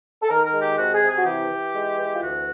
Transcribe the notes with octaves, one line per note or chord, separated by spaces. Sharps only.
A4
D#3 A#4
A#4
G#3
G4
C3 F#4
G#4
C3
G#4
F#4
E3 G4
E3
G#3
E3
F4
D2 F#4